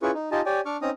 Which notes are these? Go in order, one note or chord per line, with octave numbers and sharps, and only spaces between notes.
C#4 E4 F4 G#4 B4 C#6
D#4
D#4 F4 G4 D#5 G#5 A5
G4 C#5 D5 G5 G#5
D4 C#6 D6 F6
C4 C#4 D#4 A#5 D#6